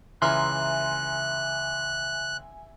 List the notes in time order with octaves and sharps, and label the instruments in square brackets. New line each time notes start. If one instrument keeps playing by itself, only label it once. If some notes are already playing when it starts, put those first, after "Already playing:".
[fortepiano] C#2 E3 F6 [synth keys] E5 G#5 [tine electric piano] A#5 C6 [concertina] F#6